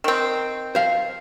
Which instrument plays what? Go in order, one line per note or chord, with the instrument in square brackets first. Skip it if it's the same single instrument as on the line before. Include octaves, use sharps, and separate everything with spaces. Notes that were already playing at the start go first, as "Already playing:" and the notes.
[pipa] D#3 C4
[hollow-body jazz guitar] C5 F5